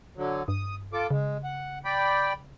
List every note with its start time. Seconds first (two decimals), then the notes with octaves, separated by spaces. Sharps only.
0.17 D3 F#3
0.48 G2 D#6
0.93 F4 A4 D6
1.11 C#3 G#3
1.44 F#5
1.85 D5 G5 B5